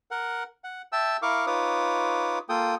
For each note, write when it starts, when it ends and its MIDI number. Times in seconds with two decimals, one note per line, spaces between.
0.11 0.43 70
0.11 0.43 78
0.64 0.82 78
0.92 1.17 76
0.92 1.17 79
0.92 1.17 81
0.92 1.17 88
1.22 1.46 64
1.22 1.46 70
1.22 1.46 77
1.22 1.46 85
1.22 1.46 86
1.46 2.39 63
1.46 2.39 65
1.46 2.39 71
1.46 2.39 73
1.46 2.39 86
1.46 2.39 87
2.49 2.75 58
2.49 2.75 65
2.49 2.75 69
2.49 2.75 79
2.49 2.75 87